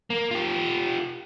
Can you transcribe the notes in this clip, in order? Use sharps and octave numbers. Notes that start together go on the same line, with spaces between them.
A#3
F4 G4